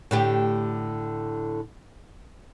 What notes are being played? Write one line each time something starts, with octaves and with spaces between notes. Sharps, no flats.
A2 D3 G4